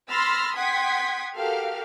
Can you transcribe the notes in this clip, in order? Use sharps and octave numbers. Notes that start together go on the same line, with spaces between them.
B5 C6 E6 F6 A6 A#6
F#5 G5 C6 D#6 G#6 B6
F#4 G4 A4 A#4 F5 F6